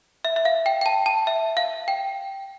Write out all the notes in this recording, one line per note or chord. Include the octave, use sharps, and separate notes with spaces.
E5
E5
F5
G5
G5
A5
A5
E5
F5
G5